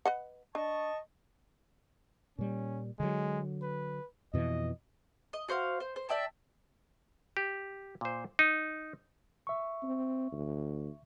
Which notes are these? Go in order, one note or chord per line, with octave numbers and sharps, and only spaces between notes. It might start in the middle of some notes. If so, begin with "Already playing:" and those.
B4 D#5 F#5
D4 D#5 A5 C#6
A#2 G3 C#4
D3 F#3 G#3
B4
F2 B2 E3 D#5
D#5
F#4 C5 D5 F5
C5
C5
D5 E5 G5 A5
G4
A#2 C5
D#4
E5 C#6
C4
D2